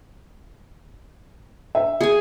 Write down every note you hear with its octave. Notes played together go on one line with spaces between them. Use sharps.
E5
G#4 G#5